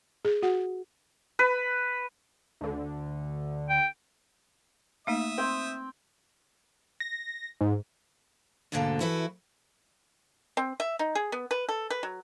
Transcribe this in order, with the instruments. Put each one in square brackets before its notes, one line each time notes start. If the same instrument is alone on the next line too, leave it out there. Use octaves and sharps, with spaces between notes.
[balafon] G#4
F#4 F#5
[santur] B4
[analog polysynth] D2 D3
[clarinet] G5
[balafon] A3 A#3 D#4 [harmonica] E5 D#6
[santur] C4 G5
[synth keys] A#6
G#2
[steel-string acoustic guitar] D2 G#2 B2 D3 A#3 A4
E3 E4 F#4 A4 B4
[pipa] C4
E5
D#4
G#4
B3
B4
A4
B4
F#3